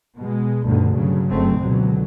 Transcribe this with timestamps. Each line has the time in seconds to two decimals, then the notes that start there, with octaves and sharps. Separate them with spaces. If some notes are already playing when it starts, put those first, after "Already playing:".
0.17 B2 G#3
0.65 D2 G2 B2 D3 D#3
0.94 G2 C#3 F#3
1.31 F#1 F#2 F#3 A3 C4
1.61 C#2 B2 D3 F#3